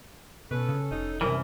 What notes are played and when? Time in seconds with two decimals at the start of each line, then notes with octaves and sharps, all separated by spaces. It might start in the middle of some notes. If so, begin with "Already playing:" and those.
0.51 B2 C#4 A4 B4
0.69 C#3
0.91 F1 D#4
1.21 C2 F#2 E3 A#4